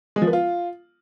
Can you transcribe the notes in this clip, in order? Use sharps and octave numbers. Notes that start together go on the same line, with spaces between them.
G#3
F3
B3
F4